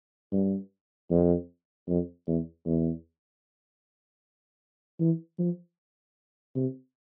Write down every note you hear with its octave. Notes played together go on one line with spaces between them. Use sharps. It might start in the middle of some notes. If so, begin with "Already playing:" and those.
G2
F2
F2
E2
E2
E3
F3
C3